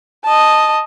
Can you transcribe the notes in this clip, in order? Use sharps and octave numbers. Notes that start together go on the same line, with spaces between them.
D#5 A5